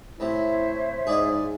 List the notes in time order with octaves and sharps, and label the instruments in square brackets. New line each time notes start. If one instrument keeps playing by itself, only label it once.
[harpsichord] A2 C3 [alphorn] E4 [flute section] C5 C#5 E5
[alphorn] G#2 [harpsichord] G#4 D5 D#5